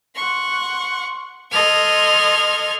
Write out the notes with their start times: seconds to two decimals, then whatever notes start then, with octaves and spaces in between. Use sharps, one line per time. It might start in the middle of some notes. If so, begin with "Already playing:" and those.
0.15 F#5 C6 C#6
1.51 A4 D#5 C6 F6 G#6